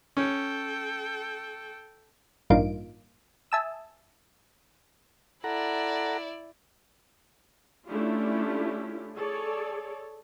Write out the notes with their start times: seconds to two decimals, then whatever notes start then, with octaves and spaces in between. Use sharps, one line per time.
0.17 C#4 A4 G5
2.50 A1 G2 A#3 D#4 F4 D7
3.52 E5 G#5 A5 D#6 E6
5.44 E4 A4 D5 F#5 A#5
7.87 A3 C#4 D4 E4 F4 G4
9.13 G#4 A4 C#5 D5